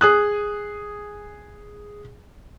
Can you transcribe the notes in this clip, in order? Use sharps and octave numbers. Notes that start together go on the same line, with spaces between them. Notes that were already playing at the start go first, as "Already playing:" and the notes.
G#4 D#6 F#6